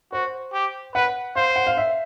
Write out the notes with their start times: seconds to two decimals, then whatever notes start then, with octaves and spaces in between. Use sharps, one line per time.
0.12 F#4 C5
0.53 G4
0.94 B4 F#5
1.36 C5 F5
1.56 F#5
1.67 F5
1.77 E5